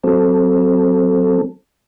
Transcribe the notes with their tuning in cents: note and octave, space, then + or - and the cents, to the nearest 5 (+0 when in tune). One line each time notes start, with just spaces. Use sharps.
F#3 +0 C4 +0 A4 +0